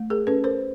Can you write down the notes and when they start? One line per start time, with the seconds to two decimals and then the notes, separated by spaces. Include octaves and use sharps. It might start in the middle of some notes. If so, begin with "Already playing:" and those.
Already playing: A3
0.10 G#4 A#4
0.27 C#4 A4 B4
0.44 A#4 C5